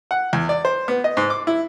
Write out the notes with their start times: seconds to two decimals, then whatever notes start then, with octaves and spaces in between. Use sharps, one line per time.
0.11 F#5
0.33 E2
0.49 D5
0.65 C5
0.88 B3
1.04 D#5
1.17 G#2
1.30 D6
1.47 E4